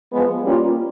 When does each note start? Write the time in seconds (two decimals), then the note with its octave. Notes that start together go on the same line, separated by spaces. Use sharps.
0.10 F3 G#3 B3
0.43 G3 A#3 C#4 F4